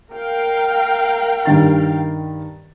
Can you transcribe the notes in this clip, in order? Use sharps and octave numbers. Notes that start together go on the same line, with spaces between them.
A#4 F5 G5
G2 D#3 A6